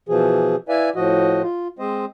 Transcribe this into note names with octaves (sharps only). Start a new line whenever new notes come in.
B2 E3 F3 G#4
E4 B4 D5 E5 F5 G#5
A2 F3 F#4 D#5
F4
G#3 C4 C5 D#5